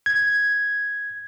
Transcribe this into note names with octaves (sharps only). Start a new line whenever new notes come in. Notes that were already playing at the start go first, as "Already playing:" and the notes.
G#6